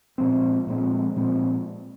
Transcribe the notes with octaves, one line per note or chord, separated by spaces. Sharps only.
A#2 F3 G#3 C4
A#2 F3 G#3 C4
A#2 F3 G#3 C4